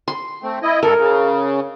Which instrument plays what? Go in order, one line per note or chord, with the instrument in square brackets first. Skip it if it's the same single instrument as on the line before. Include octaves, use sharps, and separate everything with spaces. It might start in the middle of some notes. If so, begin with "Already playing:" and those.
[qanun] C6
[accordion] A3 C4
E4 D#5
[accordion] G2 A4 [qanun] A#4
[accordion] C#3